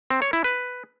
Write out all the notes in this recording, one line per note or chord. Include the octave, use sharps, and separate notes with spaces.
C4
C#5
E4
B4